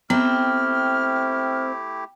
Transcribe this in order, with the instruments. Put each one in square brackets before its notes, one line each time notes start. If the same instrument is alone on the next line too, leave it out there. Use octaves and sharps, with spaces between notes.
[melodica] A3 E4 G4 [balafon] B3 [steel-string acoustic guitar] C4 [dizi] F6